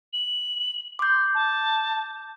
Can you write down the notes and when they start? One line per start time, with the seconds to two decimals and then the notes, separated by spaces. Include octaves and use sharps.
0.13 F#7
0.99 C6 D6 G6
1.34 A5